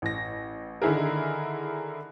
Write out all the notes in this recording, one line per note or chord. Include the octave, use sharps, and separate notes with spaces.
A1 A#6
D3 D#3 E4 G#4 A#4